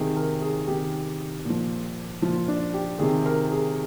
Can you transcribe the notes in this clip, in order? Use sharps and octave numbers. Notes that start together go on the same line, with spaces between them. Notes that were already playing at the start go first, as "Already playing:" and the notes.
Already playing: C3 D#3 G#4
A#4
G#4
C3 D#3 G4
A#2 F3
A#2 F3 F4
D4
G4
C3 D#3 G#4
A#4
G#4